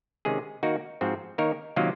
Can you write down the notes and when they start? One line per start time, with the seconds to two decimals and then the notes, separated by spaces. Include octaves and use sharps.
0.25 C3 D#3 G#3 C#4 G#4
0.63 D#3 A#3 D#4 F#4 A#4
1.01 G#2 F3 C4 F#4
1.38 D#3 A#3 D#4 A#4 C#5
1.76 C3 D#3 F#3 A#3 F4